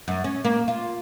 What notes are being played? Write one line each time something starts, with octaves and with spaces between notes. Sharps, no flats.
F#2
C#4
A#3
F4